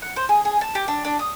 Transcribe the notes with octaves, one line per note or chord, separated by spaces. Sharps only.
F#5
C5
G#4
G#4
A5
G4
D4
D4
D#6